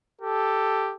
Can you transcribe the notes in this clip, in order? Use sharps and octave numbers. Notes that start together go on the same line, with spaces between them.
G4 A4